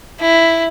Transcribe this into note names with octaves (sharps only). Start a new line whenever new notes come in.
E4